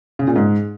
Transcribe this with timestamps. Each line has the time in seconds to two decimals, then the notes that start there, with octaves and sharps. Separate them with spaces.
0.19 C#3
0.27 A#2
0.36 G#2